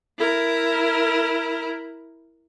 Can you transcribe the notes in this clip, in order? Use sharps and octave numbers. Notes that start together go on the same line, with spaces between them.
E4 A#4